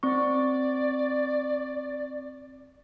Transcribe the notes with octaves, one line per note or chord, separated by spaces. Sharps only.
C4 D5 C#6